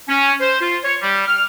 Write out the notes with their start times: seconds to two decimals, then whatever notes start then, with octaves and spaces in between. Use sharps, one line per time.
0.08 C#4
0.40 C5
0.61 F4
0.84 C#5
1.01 G3
1.26 F6